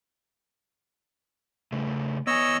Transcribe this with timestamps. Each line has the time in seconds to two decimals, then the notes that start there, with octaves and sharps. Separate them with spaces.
1.72 C#3 A3
2.27 B3 C#5 D#5 G#5 E6